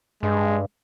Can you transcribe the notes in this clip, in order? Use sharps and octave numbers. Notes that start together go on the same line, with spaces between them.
G2 G#3